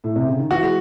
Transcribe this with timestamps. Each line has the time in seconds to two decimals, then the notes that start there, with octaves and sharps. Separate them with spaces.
0.04 A2
0.16 C3
0.27 C#3
0.39 D#3
0.50 E3 F#4
0.63 G#3